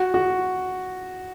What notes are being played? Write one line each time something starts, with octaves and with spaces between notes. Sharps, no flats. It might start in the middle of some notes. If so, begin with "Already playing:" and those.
Already playing: F#4
F#4